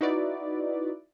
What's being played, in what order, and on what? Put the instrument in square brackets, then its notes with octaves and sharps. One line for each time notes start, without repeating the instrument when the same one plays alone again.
[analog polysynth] D#4 E4 F#4 B4 D5